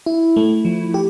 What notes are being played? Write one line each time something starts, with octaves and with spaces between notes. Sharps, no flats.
E4
A3
F3
G4